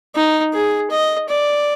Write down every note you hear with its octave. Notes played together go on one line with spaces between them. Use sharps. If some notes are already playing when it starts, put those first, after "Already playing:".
D#4
G#4
D#5
D5